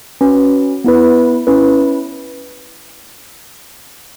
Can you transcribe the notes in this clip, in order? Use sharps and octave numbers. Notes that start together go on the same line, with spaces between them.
C#4 F#4 B4
B3 E4 B4
C#4 E4 B4